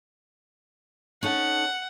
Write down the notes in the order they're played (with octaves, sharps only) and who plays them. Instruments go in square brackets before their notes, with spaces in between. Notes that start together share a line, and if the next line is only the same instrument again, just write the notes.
[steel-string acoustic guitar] C#4 D#4 A4 [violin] F#5